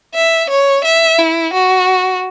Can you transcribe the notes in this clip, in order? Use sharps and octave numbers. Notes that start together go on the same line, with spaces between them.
E5
C#5
E5
E4
F#4